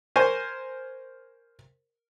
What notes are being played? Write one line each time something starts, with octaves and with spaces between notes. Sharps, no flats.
A#4 C5 G#5 C#6